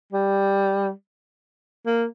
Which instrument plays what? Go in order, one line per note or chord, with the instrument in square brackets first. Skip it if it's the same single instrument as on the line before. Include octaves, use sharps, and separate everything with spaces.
[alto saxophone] G3
A#3